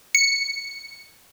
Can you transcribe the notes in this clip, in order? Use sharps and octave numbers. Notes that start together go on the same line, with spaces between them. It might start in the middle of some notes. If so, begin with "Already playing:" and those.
C#7